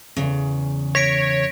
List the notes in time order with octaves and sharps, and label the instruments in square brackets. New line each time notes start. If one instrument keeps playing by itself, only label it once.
[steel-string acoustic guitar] E2 C#3
[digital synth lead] C#5 [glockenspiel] A#6 B6 D7